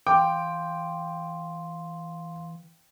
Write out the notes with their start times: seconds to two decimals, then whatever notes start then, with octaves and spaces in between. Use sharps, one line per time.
0.07 E3 F5 G5 C6 D6